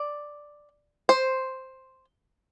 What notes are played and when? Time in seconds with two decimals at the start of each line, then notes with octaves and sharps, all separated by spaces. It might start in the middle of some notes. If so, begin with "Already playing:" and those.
Already playing: D5
1.09 C5